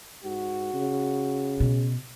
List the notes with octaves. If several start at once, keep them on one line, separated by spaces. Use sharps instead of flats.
G#2 F#4
C#3
B2